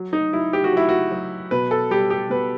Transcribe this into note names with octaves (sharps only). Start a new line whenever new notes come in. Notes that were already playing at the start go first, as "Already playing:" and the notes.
Already playing: F#3
D#4
F#3 E4
G4
F#4
F#3 E4
F#4
F#3
B2 B4
A4
G3 G4
G4
B2 B4